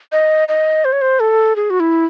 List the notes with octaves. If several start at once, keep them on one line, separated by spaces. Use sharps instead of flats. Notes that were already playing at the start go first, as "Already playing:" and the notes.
D#5
D#5
C5
C#5
C5
A4
G#4
F#4
E4